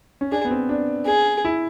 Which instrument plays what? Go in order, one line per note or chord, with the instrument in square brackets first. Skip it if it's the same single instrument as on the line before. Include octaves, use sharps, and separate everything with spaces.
[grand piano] C#4
[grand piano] D4 [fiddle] G#4
[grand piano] B3
C4
D4
[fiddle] G#4
[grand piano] E4